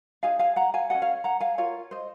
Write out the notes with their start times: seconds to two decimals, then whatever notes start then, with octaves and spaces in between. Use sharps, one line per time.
0.23 D#4 G#4 F5 G#5
0.39 F5 G#5
0.56 F#5 A#5
0.74 F5 G#5
0.90 C#4 G#4 D#5 F#5
1.02 C#5 F5
1.24 F#5 A#5
1.40 F5 G#5
1.58 F4 A#4 C#5 F5
1.91 C5 D#5